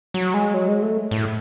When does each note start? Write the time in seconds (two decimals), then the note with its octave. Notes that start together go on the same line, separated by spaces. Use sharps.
0.14 F#3
0.34 G#3
0.54 F#3
0.68 G#3
0.82 A3
1.11 A2